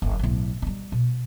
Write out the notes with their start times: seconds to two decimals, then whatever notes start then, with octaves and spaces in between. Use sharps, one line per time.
0.02 F#1 C2
0.19 B1 A2
0.62 G3 D#4
0.92 B2